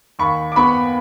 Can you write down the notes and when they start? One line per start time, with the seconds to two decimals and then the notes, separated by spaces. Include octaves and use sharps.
0.19 D#2 B5 C#6
0.52 D6
0.56 B3 B5 C#6